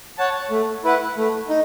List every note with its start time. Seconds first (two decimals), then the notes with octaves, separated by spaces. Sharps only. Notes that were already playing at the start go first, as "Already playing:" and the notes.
0.18 C#5 F#5 A5
0.50 A3
0.84 E4 B4 F#5
1.17 A3
1.49 D#4